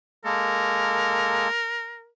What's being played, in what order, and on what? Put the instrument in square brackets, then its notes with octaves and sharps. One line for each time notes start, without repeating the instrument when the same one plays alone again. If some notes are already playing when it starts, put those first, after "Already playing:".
[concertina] G#3 A#3 A4 [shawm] A#4